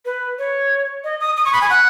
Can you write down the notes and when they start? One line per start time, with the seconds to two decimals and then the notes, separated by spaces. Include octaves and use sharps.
0.05 B4
0.39 C#5
1.04 D#5
1.20 D#6
1.37 D#6
1.45 C#6
1.53 B5
1.61 G#5
1.70 F#5